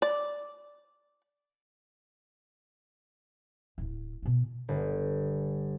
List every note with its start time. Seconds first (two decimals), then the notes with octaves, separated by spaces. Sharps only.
0.02 D5
3.78 D1 E4
4.23 B2 A#3
4.69 G1